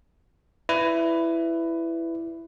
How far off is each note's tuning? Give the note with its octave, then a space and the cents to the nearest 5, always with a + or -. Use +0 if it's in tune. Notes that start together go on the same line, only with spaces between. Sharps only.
E4 +10 B4 +15 D5 +0